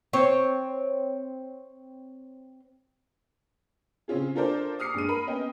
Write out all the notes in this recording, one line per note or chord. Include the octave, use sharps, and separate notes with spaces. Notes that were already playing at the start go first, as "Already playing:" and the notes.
C4 C#5
C#3 C4 C#4 F4 G#4
D4 F4 A4 A#4 C5 D5
D6 D#6 F6 C7 C#7
G2 G#3 D#7
A#4 B5
B3 C#4 D#5 G5